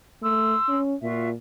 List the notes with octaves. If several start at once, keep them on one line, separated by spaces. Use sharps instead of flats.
A3 C6 E6
C#4
A#2 F4 F#4 E5